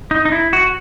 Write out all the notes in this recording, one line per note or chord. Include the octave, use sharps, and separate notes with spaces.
D#4
D#4
E4
F#4